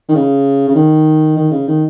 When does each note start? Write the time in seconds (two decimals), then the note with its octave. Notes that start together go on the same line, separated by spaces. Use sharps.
0.09 D#3
0.15 C#3
0.67 C#3
0.75 D#3
1.36 D#3
1.51 C#3
1.67 D#3